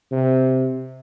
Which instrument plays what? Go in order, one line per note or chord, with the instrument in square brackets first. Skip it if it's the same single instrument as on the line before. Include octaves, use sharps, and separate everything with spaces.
[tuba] C3